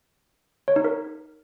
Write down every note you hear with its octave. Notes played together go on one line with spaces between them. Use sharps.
C#5
D#4
A#4